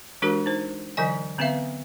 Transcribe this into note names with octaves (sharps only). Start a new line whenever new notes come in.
E3 G#3 D4 F#4 G4 A#4
D#4 C5
D3 E3 F#3 D#5 G#5
D3 B3 C4 B4 E5 F5